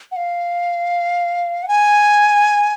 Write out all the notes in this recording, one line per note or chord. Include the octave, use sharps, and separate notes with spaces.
F#5
F5
F#5
G#5